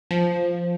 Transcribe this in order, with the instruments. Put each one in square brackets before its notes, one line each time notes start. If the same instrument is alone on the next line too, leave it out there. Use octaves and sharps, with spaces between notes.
[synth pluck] F3